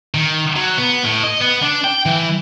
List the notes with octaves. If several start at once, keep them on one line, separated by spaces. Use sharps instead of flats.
D#3
F#3
B3
A2
D#5
B3
D4
G5
E3